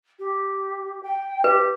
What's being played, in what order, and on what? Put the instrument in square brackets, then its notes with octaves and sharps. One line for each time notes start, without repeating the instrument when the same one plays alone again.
[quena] G4
G5
[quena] G4 [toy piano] B4